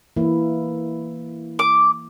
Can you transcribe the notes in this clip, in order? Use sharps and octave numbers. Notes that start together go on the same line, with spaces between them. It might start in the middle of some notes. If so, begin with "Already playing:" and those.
E3 A#3 E4
D6